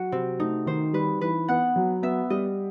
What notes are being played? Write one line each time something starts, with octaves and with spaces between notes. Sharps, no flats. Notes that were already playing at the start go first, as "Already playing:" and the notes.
Already playing: F#3 F#4
C3 C4
A3 D#4
D#3 C5
G3 B4
E3 B4
B3 F#5
F#3
B3 E5
G3 D#5